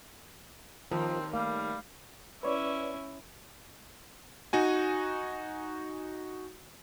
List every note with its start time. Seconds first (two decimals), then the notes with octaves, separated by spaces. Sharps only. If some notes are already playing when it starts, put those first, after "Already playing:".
0.91 D#2 F3 C4 A#4
1.33 G3 A3 A#3 F5
2.43 C#4 E4 B4 C#5 D5
4.53 D#4 F#4 G#5